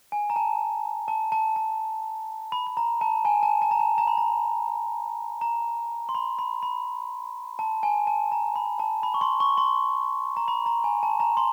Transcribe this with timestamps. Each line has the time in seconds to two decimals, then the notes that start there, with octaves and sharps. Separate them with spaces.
0.12 G#5
0.30 A#5
0.36 A5
1.08 A5
1.32 A5
1.56 A5
2.52 B5
2.67 B5
2.77 A#5
3.01 A5
3.25 G#5
3.43 A5
3.62 A5
3.71 A#5
3.80 A5
3.98 A#5
4.08 B5
4.18 A#5
5.41 A#5
6.09 C6
6.15 B5
6.39 B5
6.63 B5
7.59 A5
7.83 G#5
8.07 A5
8.32 A#5
8.56 B5
8.79 A5
9.03 B5
9.14 C#6
9.21 C6
9.40 C#6
9.58 C6
10.37 A#5
10.48 B5
10.66 A#5
10.84 G#5
11.03 A5
11.20 A#5
11.37 C6